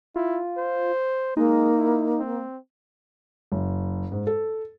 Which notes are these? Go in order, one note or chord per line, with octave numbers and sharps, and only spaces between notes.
E4 F4
C5
G#3 A#3 D#4
E4
C4
F#1
G#2
A4